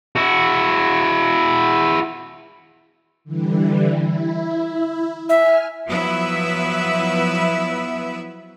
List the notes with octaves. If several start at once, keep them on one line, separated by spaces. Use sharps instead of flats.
E4 F#4
D3 E3 G3
E4
E5 G#5 F6
F3 F#3 B3 E4 B4 E5